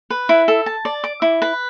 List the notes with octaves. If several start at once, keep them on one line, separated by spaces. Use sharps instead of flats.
B4
E4
A4
A5
D5
D6
E4
B4